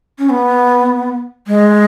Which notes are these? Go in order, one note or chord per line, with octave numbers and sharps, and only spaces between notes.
C#4
B3
G#3